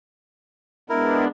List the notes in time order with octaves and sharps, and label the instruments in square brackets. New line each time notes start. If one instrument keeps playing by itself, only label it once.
[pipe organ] G#3 B3 D4 [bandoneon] E4 A#4